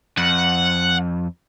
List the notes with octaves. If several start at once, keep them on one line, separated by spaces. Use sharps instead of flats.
F2 F#5